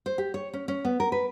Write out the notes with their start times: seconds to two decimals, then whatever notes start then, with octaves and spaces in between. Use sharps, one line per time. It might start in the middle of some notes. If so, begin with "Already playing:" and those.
0.06 C5
0.18 G4
0.34 C#5
0.53 C#4
0.68 C#4
0.85 B3
1.00 A#4
1.12 B4